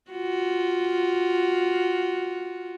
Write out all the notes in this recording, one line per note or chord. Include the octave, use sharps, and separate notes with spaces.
F4 F#4